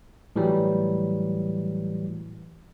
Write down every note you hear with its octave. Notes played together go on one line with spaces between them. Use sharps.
A2 E3 F#3 G3